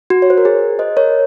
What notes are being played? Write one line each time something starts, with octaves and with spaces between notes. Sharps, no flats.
F#4
C#5
C5
A#4
G#4
C5 D#5
A#4 C#5